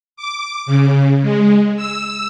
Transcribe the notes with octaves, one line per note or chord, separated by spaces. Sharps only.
D6
C#3
G#3
E6